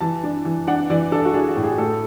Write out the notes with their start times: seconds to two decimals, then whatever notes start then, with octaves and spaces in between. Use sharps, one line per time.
0.01 E3 A5
0.24 D4
0.45 E3
0.67 D4 F#5
0.90 E3 D5
1.12 D4 A4
1.25 F#4
1.34 D4 G#4
1.48 F#4
1.56 A2
1.64 G#4
1.78 A3 A4